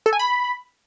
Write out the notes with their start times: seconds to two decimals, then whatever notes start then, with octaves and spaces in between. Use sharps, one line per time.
0.06 A4
0.13 G#5
0.19 B5